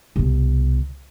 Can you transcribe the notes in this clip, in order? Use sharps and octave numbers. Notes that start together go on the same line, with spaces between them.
C2 B2